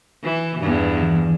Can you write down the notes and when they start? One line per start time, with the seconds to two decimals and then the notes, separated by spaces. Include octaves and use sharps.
0.24 E3
0.59 E2 G2
1.03 E3